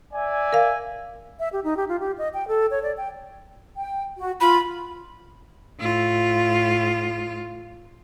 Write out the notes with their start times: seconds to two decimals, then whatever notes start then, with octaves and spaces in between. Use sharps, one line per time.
0.13 D5 E5 G#5
0.53 A#4 F5
1.39 E5
1.53 G4
1.64 D#4
1.77 G4
1.89 F4
2.00 G4
2.18 D#5
2.34 G5
2.48 A4
2.71 C#5
2.83 D5
2.97 G5
3.76 G5
4.18 F#4
4.41 F4 B5
5.80 A2 F4